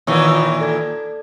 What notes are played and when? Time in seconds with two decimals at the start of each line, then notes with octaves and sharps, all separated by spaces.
0.07 A#2 D#3 E3 C#5 C#6 D#6
0.60 A4 D5 G#6